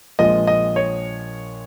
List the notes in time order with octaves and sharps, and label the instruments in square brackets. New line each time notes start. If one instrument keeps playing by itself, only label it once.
[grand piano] A#1 A#2 F3 G#3 D#5
D#5
C#5